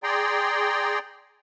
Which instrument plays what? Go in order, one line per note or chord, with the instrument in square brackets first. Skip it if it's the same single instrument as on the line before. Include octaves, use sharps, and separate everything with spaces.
[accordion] G#4 D5 G5 A#5 C6